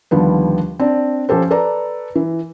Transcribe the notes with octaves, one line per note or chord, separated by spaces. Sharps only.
D#2 D3 F3 G3 B3
C4 D4 D5
F3 C#4 G4 A4 C5
A4 B4 D5 A#5
E3